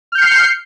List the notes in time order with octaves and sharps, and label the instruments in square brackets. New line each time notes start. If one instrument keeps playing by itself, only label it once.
[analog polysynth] F6
G6
C#7
C7